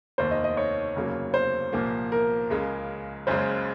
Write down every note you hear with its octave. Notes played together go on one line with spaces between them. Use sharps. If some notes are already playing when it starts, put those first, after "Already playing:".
F1 D#2 D#3 A#3 C5
D#5
D#5
C#5
F1 D#2 C#3 F#3 A#3
C5
C2 A#2 F3 A#3
A#4
C#2 C#3 G#3
F#1 F#2 C#3 G#3 C5